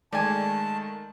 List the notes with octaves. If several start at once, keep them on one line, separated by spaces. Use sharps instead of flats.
D#3 G#3 A3 D5 G#5 A5